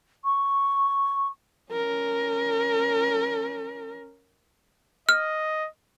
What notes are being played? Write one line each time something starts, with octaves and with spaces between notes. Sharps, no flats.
C#6
C#4 A#4
D#5 F6